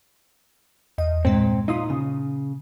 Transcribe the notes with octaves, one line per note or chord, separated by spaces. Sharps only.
E2 D#5
G2 A#2 G#3 C4
A#2 D#4 F4 D#6
C#3